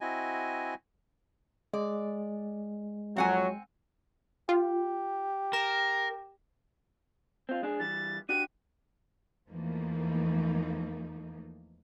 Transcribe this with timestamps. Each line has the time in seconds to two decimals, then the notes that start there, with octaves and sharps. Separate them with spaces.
0.01 C4 E4 F#4 D#5 G#5
1.73 G#3 D5
3.16 F2 F#3 C4 F#5 G#5
4.49 F4 G4
5.53 A#4 E7
7.49 C4 F4
7.62 G#3 D4 G#4
7.80 E3 G3 A6
8.29 D4 F#4 G4 D#7
9.49 E2 E3 F3 A3 A#3 D#4